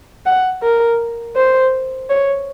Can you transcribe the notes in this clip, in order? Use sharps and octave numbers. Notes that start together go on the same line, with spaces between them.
F#5
A#4
C5
C#5